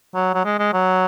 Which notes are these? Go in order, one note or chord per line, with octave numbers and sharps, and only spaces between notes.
F#3
F#3
G#3
G#3
F#3